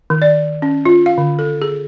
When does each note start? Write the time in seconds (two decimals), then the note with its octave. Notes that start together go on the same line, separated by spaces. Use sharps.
0.10 D#3
0.22 D5
0.62 C#4
0.85 F4
1.06 F5
1.18 D3
1.39 A4
1.62 G#4